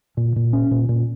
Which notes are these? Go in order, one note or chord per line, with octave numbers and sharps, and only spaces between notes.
A#2
A#2
C#4
A#2
A#2